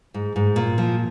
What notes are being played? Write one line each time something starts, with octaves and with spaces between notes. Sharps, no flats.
G#2
G#2
A#2
F3